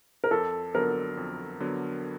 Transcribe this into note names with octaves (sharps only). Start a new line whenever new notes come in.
A#4
F2 A4
D3 F#3 B3 A#4
F2
D3 F#3 B3